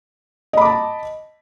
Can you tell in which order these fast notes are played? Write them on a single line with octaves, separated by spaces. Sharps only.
D#5 B5 D6 A5